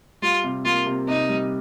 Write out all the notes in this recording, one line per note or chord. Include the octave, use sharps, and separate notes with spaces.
G3 F4
C3
A#3 F4
C3
C3 D#4
G3